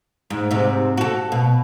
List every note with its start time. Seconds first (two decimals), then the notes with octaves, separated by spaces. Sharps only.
0.30 G#2
0.51 G#2 C3
0.97 F#4 A4
1.32 B2